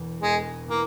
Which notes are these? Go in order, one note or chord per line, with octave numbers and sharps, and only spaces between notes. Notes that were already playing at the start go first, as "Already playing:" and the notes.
Already playing: E1 E2
E1 G#3
E3 A#3